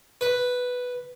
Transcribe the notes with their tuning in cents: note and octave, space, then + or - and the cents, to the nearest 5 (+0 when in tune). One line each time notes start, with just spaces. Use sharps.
B4 +0